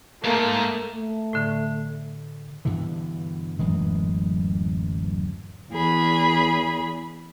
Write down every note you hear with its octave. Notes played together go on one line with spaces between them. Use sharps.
G#2 A3 A#3
A3
A2 D3
G2 B2 D3 E3
D1 F#2 E3 G#3
E2 G#4 B5